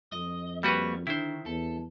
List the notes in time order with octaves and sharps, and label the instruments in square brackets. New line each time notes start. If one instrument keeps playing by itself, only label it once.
[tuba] F2 [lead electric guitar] D#5
[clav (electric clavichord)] G3 F#4 B4 [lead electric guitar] A#3 C#5
[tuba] D3 [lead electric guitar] D#3 [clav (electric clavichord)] E4 C5
[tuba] E2 [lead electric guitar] A4